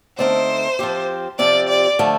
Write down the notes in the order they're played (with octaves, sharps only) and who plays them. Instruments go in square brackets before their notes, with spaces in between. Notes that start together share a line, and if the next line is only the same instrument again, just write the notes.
[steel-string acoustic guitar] D3 A3 C4 D#4 A#4 [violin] C5
[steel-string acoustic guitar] F3 C4 G4
[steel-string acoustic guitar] C3 F3 C4 G4 [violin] D5
[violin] D5
[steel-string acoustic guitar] D3 F3 A3